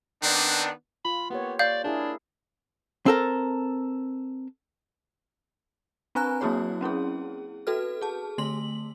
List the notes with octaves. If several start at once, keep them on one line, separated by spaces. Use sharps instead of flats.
D#3 B3 C4 D4
F4 B5
A#3 B3 G4 C#5
D5 F5 G6
D4 E4 G#4 A#4
C4 A4 A#4
C4 D4 B4 G#5 A#5 F#6
F#3 A#3 E4 F#4 G#4 C#5
C4 C#4 E4 G#4
F#4 A4 B4 F6
G#4 A5
D3 A3 C6 F#7